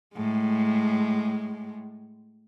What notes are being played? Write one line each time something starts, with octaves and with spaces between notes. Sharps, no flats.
A2 G#3